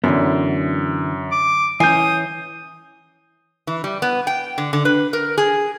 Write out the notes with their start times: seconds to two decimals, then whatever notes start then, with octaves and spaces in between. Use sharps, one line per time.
0.04 F#2 D3 E3 B3
1.31 D6
1.80 E3 C#4 G#5 D#6 G6 C7
3.67 E3
3.84 G3
4.02 B3
4.27 G5
4.58 D3
4.73 D3
4.85 B4
5.13 A#4
5.38 G#4